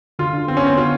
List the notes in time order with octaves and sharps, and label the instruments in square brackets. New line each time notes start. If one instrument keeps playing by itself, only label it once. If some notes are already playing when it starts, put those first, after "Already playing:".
[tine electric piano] D3 [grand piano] F4
[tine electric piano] D4
[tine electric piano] B3 [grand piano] C4
[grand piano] C#4
[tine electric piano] B3 [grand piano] C4
[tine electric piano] D3 [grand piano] F4